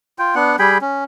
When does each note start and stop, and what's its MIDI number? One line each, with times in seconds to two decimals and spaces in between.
0.19 0.35 65
0.19 0.35 79
0.35 0.56 59
0.35 0.56 62
0.35 0.56 78
0.59 0.78 55
0.59 0.78 68
0.59 0.78 79
0.59 0.78 83
0.81 1.04 61